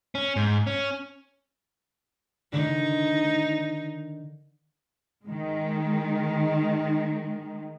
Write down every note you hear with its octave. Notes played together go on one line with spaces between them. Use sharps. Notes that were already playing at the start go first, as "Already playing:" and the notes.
C#4
G#2
C#4
D3 D#3 D#4
D#3 G#3